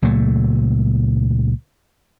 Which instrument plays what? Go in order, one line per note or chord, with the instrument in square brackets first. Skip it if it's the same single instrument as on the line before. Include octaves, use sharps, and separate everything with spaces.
[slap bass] C#2 A#2 F#3 A3